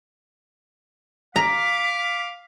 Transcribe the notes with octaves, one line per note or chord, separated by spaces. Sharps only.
F5 A#5 D6 B6